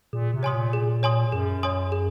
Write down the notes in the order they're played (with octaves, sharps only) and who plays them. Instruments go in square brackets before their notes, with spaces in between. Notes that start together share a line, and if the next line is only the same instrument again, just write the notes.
[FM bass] A#2 [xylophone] G#4
[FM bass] C3
[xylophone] C#5 G#5 C6 D#6
[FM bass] A#2
[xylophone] G#4
C#5 G#5 C6 D#6
[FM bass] F#2 [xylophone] G#4
[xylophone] C#5 G#5 C6 D#6
G#4